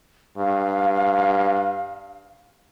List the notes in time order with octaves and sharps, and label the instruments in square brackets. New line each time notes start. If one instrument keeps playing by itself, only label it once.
[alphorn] G2 [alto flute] F5